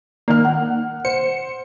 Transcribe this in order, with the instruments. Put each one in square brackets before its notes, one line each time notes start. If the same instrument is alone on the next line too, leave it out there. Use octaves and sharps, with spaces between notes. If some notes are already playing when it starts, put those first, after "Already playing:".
[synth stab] D#3 A#3 [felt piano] D5 F6
[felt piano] F#5
[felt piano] C5 [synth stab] C#7